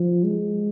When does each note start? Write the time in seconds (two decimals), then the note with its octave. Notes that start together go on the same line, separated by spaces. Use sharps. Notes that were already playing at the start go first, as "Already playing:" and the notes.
Already playing: F3
0.24 G#3